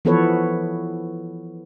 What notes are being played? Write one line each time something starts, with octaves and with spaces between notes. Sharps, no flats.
E3 F3 B3 A4 B4 C#5